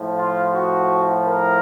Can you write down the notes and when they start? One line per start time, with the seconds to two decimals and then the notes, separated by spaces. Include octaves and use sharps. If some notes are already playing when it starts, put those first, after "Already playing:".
Already playing: A2 F3
0.16 F4
0.53 F#4
1.25 A#4